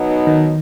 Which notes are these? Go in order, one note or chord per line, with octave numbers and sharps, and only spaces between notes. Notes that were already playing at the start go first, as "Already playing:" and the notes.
Already playing: B2 F#3 B3 D#4
D#3